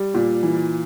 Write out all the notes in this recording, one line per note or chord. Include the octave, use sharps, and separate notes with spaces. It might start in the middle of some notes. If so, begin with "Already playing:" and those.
Already playing: G3
A#2
E3